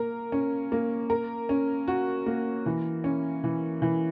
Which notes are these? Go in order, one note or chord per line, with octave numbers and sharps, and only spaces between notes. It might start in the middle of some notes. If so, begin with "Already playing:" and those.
Already playing: A#3 A#4
C#4
A#3
A#4
C#4
F#4
A#3
E3
C#4
E3
E3